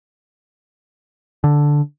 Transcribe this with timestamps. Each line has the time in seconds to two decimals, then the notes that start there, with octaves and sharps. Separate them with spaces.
1.44 D3